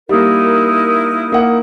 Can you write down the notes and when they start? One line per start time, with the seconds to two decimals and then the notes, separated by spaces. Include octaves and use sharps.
0.09 G3 A#3 D#4 E4 A#4
1.32 A#3 F#5